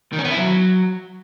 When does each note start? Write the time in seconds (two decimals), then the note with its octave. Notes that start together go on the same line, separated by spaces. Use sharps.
0.13 D#3
0.19 C#4
0.25 B3
0.31 E4
0.36 F#3